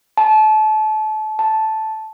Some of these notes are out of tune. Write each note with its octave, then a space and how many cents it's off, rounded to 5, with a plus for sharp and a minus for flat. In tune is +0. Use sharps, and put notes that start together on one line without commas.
A5 -30
A5 -5